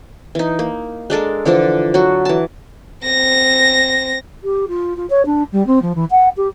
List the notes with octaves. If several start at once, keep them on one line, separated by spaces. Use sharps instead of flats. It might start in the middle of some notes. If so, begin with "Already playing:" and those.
E3 D#4
A#3
G#3 D4 A4 A#4
D3 E3 F3 D4
F#3 F#4
E3 A5
C4 A#6
G4
F4
F4
C#5
D4
G3
C4
F3
E3
F#5
G4